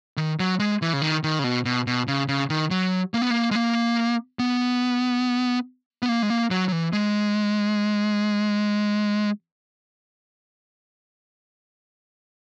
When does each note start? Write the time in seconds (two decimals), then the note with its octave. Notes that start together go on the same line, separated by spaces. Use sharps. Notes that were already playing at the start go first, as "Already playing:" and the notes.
0.17 D#3
0.40 F#3
0.59 G#3
0.82 E3
0.93 C#3
1.02 D#3
1.24 D#3
1.39 C#3
1.44 B2
1.65 B2
1.87 B2
2.08 C#3
2.28 C#3
2.50 D#3
2.71 F#3
3.14 A#3
3.22 B3
3.30 A#3
3.51 G#3
3.55 A#3
4.39 B3
6.03 B3
6.09 A#3
6.22 G#3
6.30 A#3
6.51 F#3
6.68 F#3
6.72 E3
6.93 G#3